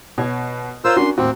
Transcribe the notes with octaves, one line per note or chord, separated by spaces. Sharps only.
B2 C#5
F4 A#4 C5 C#5 E6
C#4 D4 F#4 A#4 C6
D#2 A2 C4 F#4